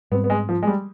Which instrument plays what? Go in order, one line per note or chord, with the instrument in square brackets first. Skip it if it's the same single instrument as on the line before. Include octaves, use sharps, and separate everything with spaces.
[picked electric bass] G#2 G3 C4 [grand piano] B3
[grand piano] B3
G#3
F3
G#3
G3